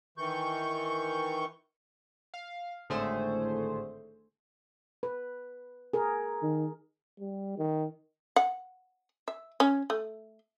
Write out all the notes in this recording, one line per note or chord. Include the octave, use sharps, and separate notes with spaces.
D#3 E3 C#6 G6
F5
G#1 A2 D3 A3 G#4 C5
B4
G#4 A#4
D#3
G3
D#3
F#5
E5
C#4
A3